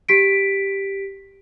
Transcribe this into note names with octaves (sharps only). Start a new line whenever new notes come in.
G4 B6 D7